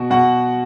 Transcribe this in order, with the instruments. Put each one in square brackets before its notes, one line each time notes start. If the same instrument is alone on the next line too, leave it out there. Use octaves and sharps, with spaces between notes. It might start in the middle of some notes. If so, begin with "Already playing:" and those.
Already playing: [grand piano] B2 F#4
B2 F#4 F#5